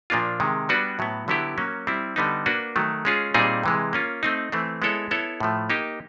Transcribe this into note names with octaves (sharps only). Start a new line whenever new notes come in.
A#2 F3 A#3 D4 F4
C3 D#3 G#3
G3 B3 D4 F#4 B4
A2 F#3 B3
D3 F#3 B3 E4 G4
F#3 A#3 C#4
G3 C4 E4
D3 G3 B3 D#4
A#3 D4 F#4 B4
D#3 F#3 A3
G#3 C#4 F4 G#4
A#2 G3 C4 D#4 G#4
C3 E3 G#3
A#3 C#4 F4
A3 C4 D#4
E3 A3 C4
G#3 B3 E4 A4 C#5
B3 E4 A4 C#5
A2 F3 A3
A#3 D#4 G4